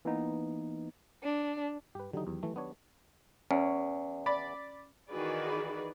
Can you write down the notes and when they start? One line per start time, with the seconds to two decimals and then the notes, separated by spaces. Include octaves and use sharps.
0.05 E3 A#3 B3 D#4
1.23 D4
1.95 G2 G4 B4
2.13 D3 D#3 F#3 D#4 G4
2.27 E2
2.43 E3 A3
2.56 B3 D4 C#5
3.51 E2 C#4
4.26 D5 B5
5.10 D#3 E3 F#4 G#4 B4 D5